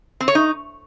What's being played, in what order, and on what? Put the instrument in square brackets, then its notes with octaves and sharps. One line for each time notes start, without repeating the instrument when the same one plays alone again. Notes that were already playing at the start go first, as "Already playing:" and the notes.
[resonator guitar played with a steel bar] C4
C#5
D#4